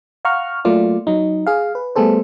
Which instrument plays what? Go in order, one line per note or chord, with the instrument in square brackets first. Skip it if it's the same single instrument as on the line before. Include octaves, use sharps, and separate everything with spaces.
[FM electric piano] F5 F#5 A#5 C#6 F6
F#3 A3 A#3 F4 D5
F#3 D#4
G#4 F5
B4
G3 A3 B3 G#4 A4 C5